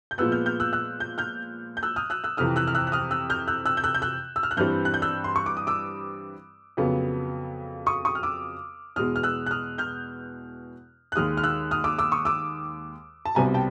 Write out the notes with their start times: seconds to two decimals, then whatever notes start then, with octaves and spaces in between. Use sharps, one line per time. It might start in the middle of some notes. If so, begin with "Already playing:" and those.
0.11 G6
0.18 A#2 F3 G#3 B3 E6 F#6
0.32 F6 G6
0.46 F6 G6
0.60 E6 F#6
0.73 E6 F#6
1.00 G6
1.18 F6 G6
1.77 G6
1.83 E6 F#6
1.96 D#6 F6
2.10 E6 F#6
2.24 E6 F#6
2.37 F2 C3 E3 D#6 F6
2.56 E6 F#6
2.67 F6
2.75 E6 F#6
2.87 F#6
2.92 D#6 F6
3.11 E6 F#6
3.30 F6 G6
3.48 E6 F#6
3.66 E6 F#6
3.77 G6
3.84 E6 F#6
3.94 G6
4.02 E6 F#6
4.36 E6
4.43 F6
4.51 F#6
4.57 G2 E3 G3 C4 F6 G6
4.85 F#6
4.94 G6
5.02 E6 F#6
5.24 C6
5.36 C#6
5.46 D6
5.57 D#6
5.67 D6 E6
6.77 F2 C#3 F#3 B3
7.86 C#6 D#6
8.05 C#6 D#6
8.15 F6
8.23 D6 E6
8.96 E2 B2 G#3 D#6 F6
9.16 F6
9.23 E6 F#6
9.46 F#6
9.51 D#6 F6
9.78 F6 G6
11.12 F#6
11.16 D#2 D#3 G#3 D#6 F6
11.37 F6
11.43 E6 F#6
11.71 D#6 F6
11.84 D6 E6
11.98 D6 E6
12.12 C#6 D#6
12.25 D6 E6
13.25 A5
13.35 C2 B2 G3 C4 G#5 A#5
13.54 G5 A5